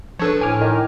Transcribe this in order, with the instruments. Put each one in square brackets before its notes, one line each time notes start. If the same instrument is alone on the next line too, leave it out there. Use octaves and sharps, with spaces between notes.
[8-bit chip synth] F3 D4 B4 [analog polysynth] A4 C#5
[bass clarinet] A2 [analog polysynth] G#5 D6 F6
[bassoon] D#3